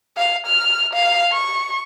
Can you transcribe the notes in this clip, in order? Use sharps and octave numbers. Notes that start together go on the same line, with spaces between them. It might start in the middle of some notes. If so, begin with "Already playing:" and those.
F5
F6
F5
C#6